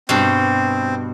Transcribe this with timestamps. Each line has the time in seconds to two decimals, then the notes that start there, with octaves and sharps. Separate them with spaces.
0.09 G2 B2 C4